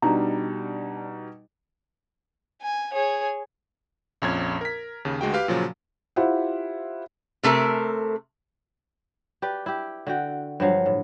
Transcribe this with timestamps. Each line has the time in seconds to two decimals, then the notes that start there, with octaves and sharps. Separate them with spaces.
0.02 B2 G3 D4 D#4 A#5
2.61 G#5
2.93 G#4 C#5
4.22 A#1 F2 C#4 G#6
4.61 A#4 B6
5.05 D#2 C#3
5.21 D2 G#3 F#4 G5
5.34 G4 B4 F5 G5
5.48 A#2 C#3 F3 F#3
6.16 E4 F4 G4 C5 E5 F#5
7.43 C3 A3 A4 A#4
9.42 G4 B4 D5
9.66 E4 G4
10.07 D3 F#4 G5
10.60 G2 F3 F#3 F5
10.86 A2